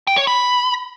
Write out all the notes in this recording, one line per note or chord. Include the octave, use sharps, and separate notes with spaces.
G5
C#5
B5